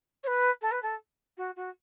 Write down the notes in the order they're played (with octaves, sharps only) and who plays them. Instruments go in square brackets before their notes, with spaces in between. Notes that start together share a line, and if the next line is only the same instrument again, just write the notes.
[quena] C#5
B4
A4
B4
A4
F#4
F#4